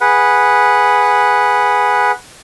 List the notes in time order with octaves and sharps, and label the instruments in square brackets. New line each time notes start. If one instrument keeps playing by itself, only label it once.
[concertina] G#4 B4 F#5